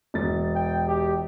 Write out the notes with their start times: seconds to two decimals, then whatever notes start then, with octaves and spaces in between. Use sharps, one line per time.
0.14 E1 A6
0.55 G5
0.87 G4